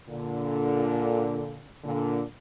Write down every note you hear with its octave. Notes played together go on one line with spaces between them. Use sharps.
A#2 D3
A#2 D3